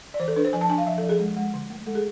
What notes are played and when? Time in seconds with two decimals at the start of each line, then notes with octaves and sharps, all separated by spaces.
0.14 D5
0.20 E3 C5
0.28 A4
0.36 D4 B4
0.45 C5
0.53 F3 G#5
0.61 A5
0.70 D4 G#5
0.78 F5
0.87 F3 E5
0.98 A4
1.03 F3
1.09 G#4
1.20 G#3
1.37 G#3
1.54 D3
1.70 A3
1.86 G#3 A4
1.95 G#4